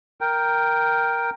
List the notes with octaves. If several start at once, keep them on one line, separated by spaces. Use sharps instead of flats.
A#4 G5